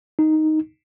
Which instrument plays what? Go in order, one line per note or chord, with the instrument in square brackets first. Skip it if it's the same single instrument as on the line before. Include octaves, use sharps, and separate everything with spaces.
[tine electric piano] D#4